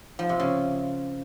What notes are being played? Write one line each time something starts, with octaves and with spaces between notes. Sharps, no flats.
F3
C3
C#3